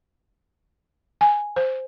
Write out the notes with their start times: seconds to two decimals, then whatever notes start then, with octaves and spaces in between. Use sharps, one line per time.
1.21 G#5
1.56 C5